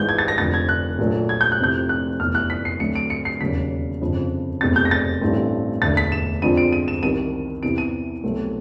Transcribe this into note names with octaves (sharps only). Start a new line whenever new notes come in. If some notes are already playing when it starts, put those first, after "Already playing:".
Already playing: G#1 G#2 E3 G#3 B3 G6
G#6
A6
A#6
F1 F2 D3 A6
G#6
F#6
A#1 A#2 F#3 A3
G#6
G6
F#6
F1 F2 C3 E3 G6
F#6
F1 E2 C3 E3 F6
F#6
B6
C7
D2 D3 F#3 A3 C4 C#7
D7
C#7
C7
E1 D#2 C#3 F#3 B6
G1 F2 C#3
F1 E2 B2 G#3 C4 A6
G6
A#6
A6
A1 G2 E3 A3 C4
E1 D2 D3 A6
B6
E7
F2 D3 F3 G#3 C4 D#7
D7
D#7
E7
C2 C3 D#3 D#7
E2 C3 E3 D7
D#7
C2 B2 F#3 A3 C4